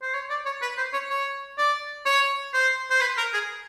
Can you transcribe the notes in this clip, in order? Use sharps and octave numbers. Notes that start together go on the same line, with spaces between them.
C5
C#5
D5
C#5
B4
C5
C#5
C#5
D5
C#5
C5
C5
B4
A#4
G#4